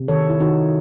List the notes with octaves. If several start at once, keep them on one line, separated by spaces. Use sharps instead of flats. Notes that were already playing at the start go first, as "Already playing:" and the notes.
Already playing: C3
D#3 A4 C#5
E4
D#3 D#4 F#4